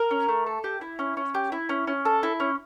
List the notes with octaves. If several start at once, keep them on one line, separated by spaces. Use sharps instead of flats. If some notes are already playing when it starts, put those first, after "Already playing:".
Already playing: A#4
C#4
A3
A4
G4
E4
C#4
C#4
G4
E4
C#4
C#4
A4
E4
C#4